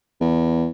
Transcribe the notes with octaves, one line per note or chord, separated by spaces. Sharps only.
E2